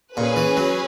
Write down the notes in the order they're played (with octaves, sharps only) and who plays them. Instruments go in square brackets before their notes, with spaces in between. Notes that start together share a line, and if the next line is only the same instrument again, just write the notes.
[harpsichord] A#2 [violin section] C#4 G#4 B4
[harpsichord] E3
F#3